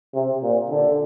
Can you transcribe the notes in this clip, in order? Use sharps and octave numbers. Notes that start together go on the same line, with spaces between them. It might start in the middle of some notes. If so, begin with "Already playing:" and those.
C3
A#2
D3